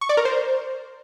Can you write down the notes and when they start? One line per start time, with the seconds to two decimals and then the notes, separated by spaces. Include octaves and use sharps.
0.01 C#6
0.09 D5
0.17 A#4
0.25 C5